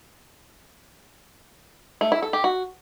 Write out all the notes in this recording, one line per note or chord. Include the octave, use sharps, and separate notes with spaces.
A3
E4
A4
G4
F#4